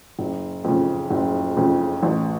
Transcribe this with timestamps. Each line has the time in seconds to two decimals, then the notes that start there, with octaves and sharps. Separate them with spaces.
0.19 F#1
0.64 F2 C#3
1.10 F#1
1.57 F2 C#3
2.03 A1